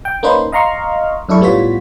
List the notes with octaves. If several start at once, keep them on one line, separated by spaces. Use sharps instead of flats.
G5
A#3 C#4 D#4 B4 C5
D#5 F5 A#5 C6 C#6 F6
F#2 D4 E4 A4 C#6
A2 G3 B3 F4 C#5 B6